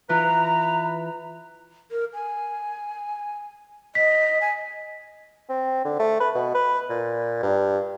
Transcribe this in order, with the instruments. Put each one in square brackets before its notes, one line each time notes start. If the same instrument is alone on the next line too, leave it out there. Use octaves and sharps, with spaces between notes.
[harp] E3 F4 [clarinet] B4 [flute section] A#5
[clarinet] B4
[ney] A#4
G#5
[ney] D#5 [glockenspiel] B6
[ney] G#5
[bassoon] C4
D3
A3
B4
B2
B4
A#2
G2